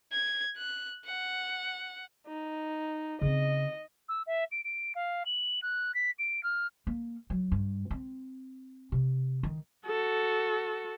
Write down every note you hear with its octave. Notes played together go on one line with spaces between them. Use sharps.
G#6
F#6
F#5
D#4
C#3 C4 D#5
E6
E5
D7
D7
F5
F#7
F#6
B6
D7
F6
A#3
F#3
G2
C4
C3
D#3
F#4 A4